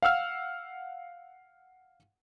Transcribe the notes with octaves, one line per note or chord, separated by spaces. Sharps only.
F5 F#5 E6 F6